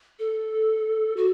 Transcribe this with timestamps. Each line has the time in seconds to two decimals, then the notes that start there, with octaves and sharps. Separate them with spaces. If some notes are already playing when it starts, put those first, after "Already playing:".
0.19 A4
1.17 F#4